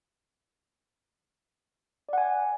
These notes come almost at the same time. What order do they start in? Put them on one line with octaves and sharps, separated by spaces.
D5 F#5 G#5